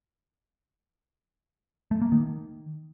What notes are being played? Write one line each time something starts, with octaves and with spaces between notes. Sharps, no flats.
A3
A#3
D#3